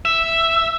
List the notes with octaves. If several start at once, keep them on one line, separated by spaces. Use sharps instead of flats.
E5